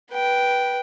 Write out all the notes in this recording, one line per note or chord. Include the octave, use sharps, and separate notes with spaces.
B4 G5